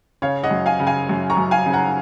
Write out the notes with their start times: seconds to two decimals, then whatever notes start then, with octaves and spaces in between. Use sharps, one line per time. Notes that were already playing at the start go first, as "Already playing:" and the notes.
0.22 C#3 C#5 F5
0.44 D#5 F#5
0.51 F#2
0.66 F5 G#5
0.80 C#3
0.87 F5 G#5
1.09 F#2
1.30 A#5 C#6
1.37 F#2
1.51 F5 G#5
1.66 C#3
1.73 F#5 A#5